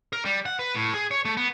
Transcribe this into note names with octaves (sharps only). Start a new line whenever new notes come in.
A#4
G3
F#5
B4
A2
G#4
C#5
A3
B3